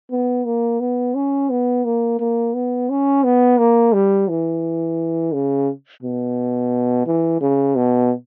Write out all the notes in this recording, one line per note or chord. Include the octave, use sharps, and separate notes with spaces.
B3
A#3
B3
C#4
B3
A#3
A#3
B3
C#4
B3
A#3
G3
E3
C#3
B2
E3
C#3
B2